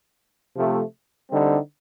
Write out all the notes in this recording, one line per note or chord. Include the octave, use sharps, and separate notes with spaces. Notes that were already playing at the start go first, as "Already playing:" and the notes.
C3 F3 A3
D3 G3 C4 D#4